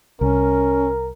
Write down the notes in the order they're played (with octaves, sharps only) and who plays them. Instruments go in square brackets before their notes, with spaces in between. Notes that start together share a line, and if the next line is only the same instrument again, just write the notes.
[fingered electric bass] C2 [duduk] C#4 [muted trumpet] A#4